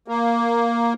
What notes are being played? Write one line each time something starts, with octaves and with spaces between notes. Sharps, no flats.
A#3